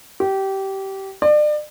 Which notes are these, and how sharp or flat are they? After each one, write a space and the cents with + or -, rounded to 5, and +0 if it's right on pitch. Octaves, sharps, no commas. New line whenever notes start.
G4 -20
D5 +35